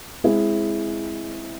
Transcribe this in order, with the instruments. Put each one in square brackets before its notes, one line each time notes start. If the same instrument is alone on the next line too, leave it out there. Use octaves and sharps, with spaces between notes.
[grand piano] G#3 C4 E4 G#4